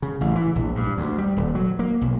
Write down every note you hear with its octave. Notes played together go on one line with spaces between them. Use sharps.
C#3
A1
E3
A#1
G2
D2
G3
D#1
F#3
A#3
B1